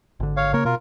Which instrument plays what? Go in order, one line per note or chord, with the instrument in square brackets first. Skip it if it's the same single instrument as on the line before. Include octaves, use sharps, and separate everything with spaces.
[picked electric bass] G#1 D3
[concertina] C#5 F5
[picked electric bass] C#3 A#3 [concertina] A#4 C#5
[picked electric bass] B2 [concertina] F4 A#4